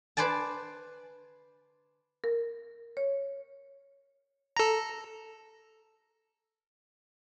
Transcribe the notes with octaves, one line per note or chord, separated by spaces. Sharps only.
B4 C5 D5 G#5 A5
A#4
C#5
A4 A#5